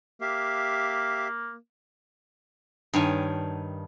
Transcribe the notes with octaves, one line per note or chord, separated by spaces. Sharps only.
A#3 G4 E5 F5
G2 D#3 C#5 G#5